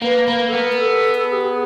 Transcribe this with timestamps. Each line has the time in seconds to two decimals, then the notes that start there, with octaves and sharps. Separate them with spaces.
0.02 A#3 B4
0.28 A#3 B4
0.48 A4
0.52 B3 A#4
0.72 A#4
0.77 A4
1.15 A4
1.24 G#4
1.32 G4
1.41 G#4